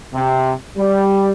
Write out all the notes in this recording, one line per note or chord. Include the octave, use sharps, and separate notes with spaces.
C3
G3